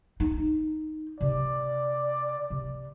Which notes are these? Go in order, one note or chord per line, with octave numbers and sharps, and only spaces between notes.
D#4
C3 D5
C3